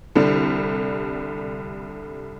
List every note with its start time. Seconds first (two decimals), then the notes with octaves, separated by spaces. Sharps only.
0.15 C2 D3 G3